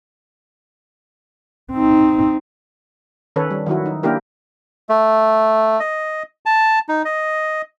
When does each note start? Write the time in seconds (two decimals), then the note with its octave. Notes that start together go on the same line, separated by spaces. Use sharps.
1.72 C4 D#4
3.36 D#3 C#4 A4 B4 C#5
3.51 G3
3.66 D#3 F#3 E4 F#4
3.86 D#4
4.03 A#3 D4 E4 G4 A#4
4.89 A3
5.80 D#5
6.46 A5
6.89 D#4
7.05 D#5